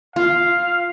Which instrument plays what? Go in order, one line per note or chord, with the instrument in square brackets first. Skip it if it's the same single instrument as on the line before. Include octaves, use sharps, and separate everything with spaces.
[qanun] F4 [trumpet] F5